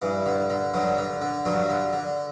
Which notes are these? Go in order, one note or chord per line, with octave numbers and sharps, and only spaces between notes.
G2 E3
D3
D3
G2 F#3
D3
D3
G2 F#3
D3
D3